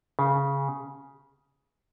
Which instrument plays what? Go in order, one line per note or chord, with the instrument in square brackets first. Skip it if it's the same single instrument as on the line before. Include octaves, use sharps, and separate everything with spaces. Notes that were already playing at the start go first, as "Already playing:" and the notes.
[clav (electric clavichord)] C#3